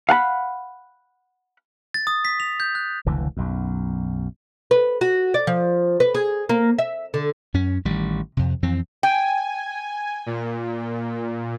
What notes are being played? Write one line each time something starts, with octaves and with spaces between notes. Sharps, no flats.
F5 F#5 A5 B5
A6
D#6
B6
F7
G6
F#6
F1 C#2 D3 E3
B1 F#2
B4
F#4
D5
F3
B4
G#4
A#3
E5
D3
F#2 C#4
A1 D#3 G3
F2 C3
F2 E3 C4
G5 G#5
A#2